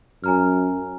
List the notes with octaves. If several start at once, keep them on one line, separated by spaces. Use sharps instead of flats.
F#2 G#5 A#5 F6